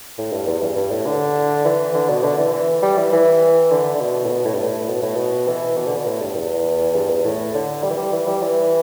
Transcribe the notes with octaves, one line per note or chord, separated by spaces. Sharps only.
A2
G2
E2
G2
G2
A2
D3
E3
D3
B2
D3
E3
E3
G3
E3
E3
D3
D3
B2
A2
B2
A2
G2
A2
B2
A2
B2
E3
B2
D3
B2
A2
G2
E2
G2
E2
A2
D3
G3
E3
G3
E3
G3
E3